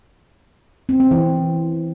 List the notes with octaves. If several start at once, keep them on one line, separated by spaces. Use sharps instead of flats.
C4
C4
E3